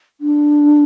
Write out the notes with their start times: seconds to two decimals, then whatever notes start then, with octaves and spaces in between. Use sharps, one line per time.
0.21 D4